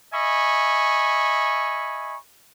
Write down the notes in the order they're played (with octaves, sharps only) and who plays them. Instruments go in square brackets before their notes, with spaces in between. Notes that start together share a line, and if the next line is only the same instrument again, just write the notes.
[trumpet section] D#5 E5 G#5 B5 C#6